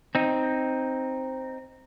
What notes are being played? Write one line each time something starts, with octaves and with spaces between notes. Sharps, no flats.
C4 D#4